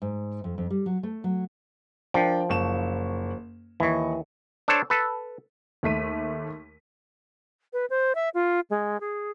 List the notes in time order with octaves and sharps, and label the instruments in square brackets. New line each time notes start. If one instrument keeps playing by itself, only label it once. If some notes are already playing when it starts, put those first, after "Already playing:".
[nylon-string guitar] G#2
F2
F2
G3
F#3
A3
F#3
[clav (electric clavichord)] F3 [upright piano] D4 A#4 G5
[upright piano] F#1 C#6 E7
[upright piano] D#2 D#5 C#6 [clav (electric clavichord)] E3
[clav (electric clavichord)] D4 A4 C5 C#5 A5
A4 B4
[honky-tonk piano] D#2 A3 B6 D#7
[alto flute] B4
C5
E5
F4
G#3
G#4